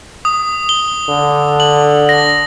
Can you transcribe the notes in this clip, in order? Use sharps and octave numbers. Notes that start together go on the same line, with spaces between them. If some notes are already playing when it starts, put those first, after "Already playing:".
D#6
G7
D3
F#7
A#6